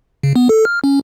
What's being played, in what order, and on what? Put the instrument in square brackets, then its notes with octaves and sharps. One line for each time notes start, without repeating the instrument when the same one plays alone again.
[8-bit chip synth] C#3
B3
A4
F6
C#4